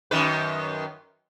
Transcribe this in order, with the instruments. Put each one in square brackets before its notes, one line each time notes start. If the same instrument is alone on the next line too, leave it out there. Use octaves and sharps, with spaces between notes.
[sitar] F#2 D#3 B4